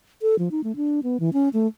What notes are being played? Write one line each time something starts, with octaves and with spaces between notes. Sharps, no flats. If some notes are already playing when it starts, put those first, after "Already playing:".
A4
F3
D#4
A3
D4
B3
E3
C#4
A3